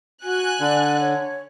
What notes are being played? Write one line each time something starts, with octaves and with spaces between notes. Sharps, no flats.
F#4 G#5 F#6
D3 D5
C#5